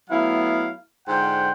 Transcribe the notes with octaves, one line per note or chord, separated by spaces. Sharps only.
F#3 A3 B3 E4 F5
G#2 D3 F4 C5 F#5 G5